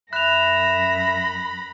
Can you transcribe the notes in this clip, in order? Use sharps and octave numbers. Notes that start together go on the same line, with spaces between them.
F#2 E5 B5 F#6 A#6 F7